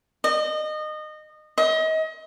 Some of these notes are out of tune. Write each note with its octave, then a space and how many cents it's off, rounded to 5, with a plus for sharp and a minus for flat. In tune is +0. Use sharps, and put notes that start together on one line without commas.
D#5 -25
D#5 +35